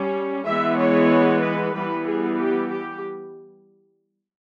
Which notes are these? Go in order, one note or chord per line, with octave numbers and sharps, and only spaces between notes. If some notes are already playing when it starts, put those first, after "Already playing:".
Already playing: G3 C#4
E3 G#3 B3 E5
C#5
B4
E3 G3 B3 B4
G#4
G4
G4